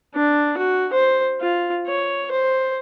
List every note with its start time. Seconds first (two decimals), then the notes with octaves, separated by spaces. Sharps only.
0.14 D4
0.57 F#4
0.93 C5
1.41 F4
1.87 C#5
2.31 C5